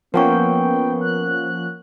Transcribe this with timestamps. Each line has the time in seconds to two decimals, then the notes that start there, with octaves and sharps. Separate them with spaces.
0.14 F3 A#3 B3 C#4 A#4 F#5 G5 C#6
1.01 F#6